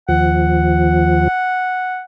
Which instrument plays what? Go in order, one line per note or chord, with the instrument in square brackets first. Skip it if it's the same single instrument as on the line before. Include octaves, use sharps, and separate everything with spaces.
[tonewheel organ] D#2 F3 [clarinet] F#5